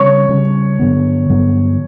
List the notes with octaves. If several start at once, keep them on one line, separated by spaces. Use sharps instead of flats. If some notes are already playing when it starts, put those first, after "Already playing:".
Already playing: C#3 G3 C#4 C#5 C#6
C#3 G3 C#4
G2 D3 F#3 B3
G2 D3 F#3 B3